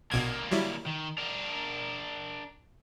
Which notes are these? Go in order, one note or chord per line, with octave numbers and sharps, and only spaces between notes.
A#1 B2 D3 A#3 G#6
F#3 G3 E4
D#3
D4 A#4